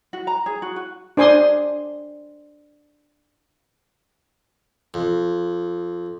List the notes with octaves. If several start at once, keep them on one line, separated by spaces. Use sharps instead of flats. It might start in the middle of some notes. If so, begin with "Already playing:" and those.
F#4
A#5
G#4
F#4
F#4
D4 C5 G#5 C6 D#6
F2